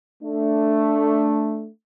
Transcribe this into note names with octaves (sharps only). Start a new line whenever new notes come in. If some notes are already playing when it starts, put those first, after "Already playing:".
A3 D4